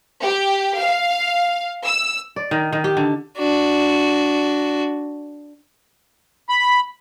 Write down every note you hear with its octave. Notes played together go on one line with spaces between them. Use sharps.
G4
F5
E6
D5
D#3
D#3
G4
D3
D4 F#4
B5